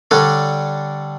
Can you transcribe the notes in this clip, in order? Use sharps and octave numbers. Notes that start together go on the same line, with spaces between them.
D3 G3 D4 A4 C#5